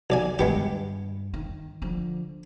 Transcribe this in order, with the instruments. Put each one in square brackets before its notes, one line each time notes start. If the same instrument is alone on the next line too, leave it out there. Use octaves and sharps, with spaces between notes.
[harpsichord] B1 D5 G#5
[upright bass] G2 [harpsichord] G#3 B3 G4
[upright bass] D#3
D3 F3